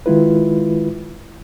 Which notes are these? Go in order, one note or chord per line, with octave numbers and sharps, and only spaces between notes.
D#3 G#3 E4 F4 B4